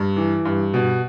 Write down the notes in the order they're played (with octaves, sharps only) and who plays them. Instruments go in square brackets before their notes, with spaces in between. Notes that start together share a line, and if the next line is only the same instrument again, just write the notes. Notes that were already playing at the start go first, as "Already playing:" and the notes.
Already playing: [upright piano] G2
E3
G2
B2